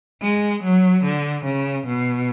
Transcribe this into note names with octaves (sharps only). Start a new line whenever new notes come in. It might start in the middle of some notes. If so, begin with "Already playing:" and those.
G#3
F#3
D3
C#3
B2